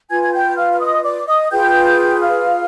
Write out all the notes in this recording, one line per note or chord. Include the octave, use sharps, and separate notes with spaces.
F4 B4 G#5 G#6
G#6
G5 G6
F5 F6
F6
D#5 D#6
D5 D6
D#5 D#6
F4 G#4 B4 G5 G6
G6
F5 F6